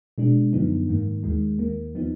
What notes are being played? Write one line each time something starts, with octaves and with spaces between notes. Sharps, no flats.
B2 G#3 D4
F#2 D3 F3 B3 D#4
G#2 D#3 A#3
D#2 D#3 G#3
D#2 D#3 A#3
F3 B3 D#4